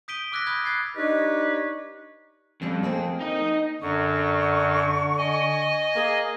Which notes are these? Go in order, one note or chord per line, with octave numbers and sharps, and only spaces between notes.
D#6 G6 B6 D7 D#7 G7
D6 E6 F#6 G#6 A#6 B6
B5 D#6 F6 G6 G#6
D#6 F#6 G#6 A6 C7
D4 D#4 G4 B4 C#5 D#5
F2 G3 C#4
A#3 C4 G#4
D#4 D#5
F#2 D3 C#6
D#5 G#5
A#3 G#4